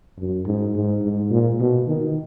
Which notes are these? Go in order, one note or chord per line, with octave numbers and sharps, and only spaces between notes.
F#2
G#2
G#2
G#2
A#2
B2
D#3